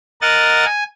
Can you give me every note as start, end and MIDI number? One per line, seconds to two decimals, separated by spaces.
0.22 0.65 70
0.22 0.65 75
0.22 0.65 78
0.22 0.65 93
0.66 0.84 80